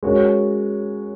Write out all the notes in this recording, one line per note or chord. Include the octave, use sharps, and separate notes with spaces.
G#3 C#4 F#4 A#4 C#5